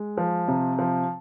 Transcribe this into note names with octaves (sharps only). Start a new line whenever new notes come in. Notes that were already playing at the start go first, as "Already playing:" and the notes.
Already playing: G#3
F3
C3
F3